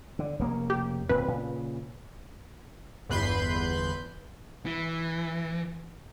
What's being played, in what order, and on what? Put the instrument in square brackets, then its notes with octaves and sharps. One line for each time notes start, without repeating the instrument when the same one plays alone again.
[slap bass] D3
F1 C#3 A#3
[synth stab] G4
[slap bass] D1 A#2 C4 [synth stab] B4
[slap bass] A#2 C#3
[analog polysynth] G1 E2 B4 B5 C6 G6
[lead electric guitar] E3